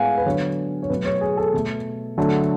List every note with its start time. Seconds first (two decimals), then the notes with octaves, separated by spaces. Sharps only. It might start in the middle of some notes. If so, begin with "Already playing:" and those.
Already playing: A2 G#3 B3 F5 F#5 G#5
0.18 B4
0.25 D3 F#3 B3 C#5
0.83 C#5
0.90 B2 F#3 A3 B4
1.05 C#5
1.21 G#4
1.37 A4
1.53 B2 A3
2.18 D3 F#3 A3